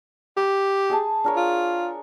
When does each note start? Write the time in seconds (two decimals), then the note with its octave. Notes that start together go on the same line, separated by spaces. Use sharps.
0.37 G4
0.90 G#4 G#5 A5
1.24 D4 A#4 C#5
1.36 F4